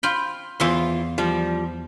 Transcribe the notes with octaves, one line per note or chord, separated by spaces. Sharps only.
F4 G5 B5
E2 E3 F4 E5 C6
F3 G3